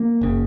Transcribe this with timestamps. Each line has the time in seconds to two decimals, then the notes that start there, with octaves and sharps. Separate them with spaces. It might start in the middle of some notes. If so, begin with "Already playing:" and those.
Already playing: A#3
0.21 F#1 C#3